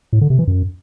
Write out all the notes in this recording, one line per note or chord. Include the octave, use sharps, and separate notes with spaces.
A2
D3
C3
E3
F#2